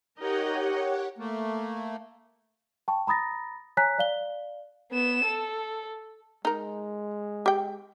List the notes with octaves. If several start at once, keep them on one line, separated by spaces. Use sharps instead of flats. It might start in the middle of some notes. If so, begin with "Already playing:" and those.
D#4 G4 A#4 C#5 D#5 F#5
A3 A#3
G5 A5 C#6
A#5 B5 D#6 A6 A#6
C#5 G#5 A#5 F#6 B6
D5 F5 G7
B3 E7
A4
G#3 D#4 A#4
G4 G5